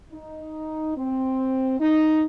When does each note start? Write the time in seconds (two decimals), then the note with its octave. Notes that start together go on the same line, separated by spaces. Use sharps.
0.13 D#4
0.96 C4
1.80 D#4